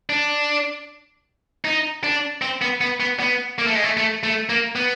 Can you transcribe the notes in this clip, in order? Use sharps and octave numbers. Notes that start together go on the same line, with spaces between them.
D4
D#4
D4
C4
B3
B3
B3
B3
A#3
A3
G#3
A3
A3
A3
A#3
B3